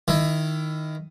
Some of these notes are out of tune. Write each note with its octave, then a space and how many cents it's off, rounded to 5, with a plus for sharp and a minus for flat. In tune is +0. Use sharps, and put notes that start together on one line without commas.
D#3 +0 E4 +15